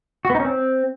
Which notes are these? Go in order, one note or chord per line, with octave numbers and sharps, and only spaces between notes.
F#4
B3
D#4
C#4
C4